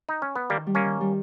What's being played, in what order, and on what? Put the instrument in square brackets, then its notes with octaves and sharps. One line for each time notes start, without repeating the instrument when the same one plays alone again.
[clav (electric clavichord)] D#4
C#4
B3
[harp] D#3 [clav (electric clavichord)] G3 A#3
[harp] G3
[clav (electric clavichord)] A#3 C#4
[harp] D#3
G3